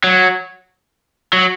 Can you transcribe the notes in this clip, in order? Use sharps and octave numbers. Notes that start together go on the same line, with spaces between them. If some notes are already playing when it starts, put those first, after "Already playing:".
F#3
F#3